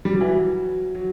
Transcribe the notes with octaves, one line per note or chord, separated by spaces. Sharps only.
G3
F#3
E3
F#3
F#3